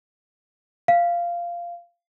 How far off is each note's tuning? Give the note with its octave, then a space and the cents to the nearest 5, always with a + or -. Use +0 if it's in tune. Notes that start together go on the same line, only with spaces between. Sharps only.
F5 -10